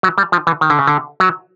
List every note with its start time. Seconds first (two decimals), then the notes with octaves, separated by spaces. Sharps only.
0.03 F#3
0.18 G3
0.32 F3
0.47 E3
0.61 D#3
0.70 D3
0.79 C#3
0.87 D3
1.20 F#3